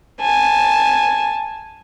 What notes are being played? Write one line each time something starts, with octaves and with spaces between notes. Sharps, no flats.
G#5 A5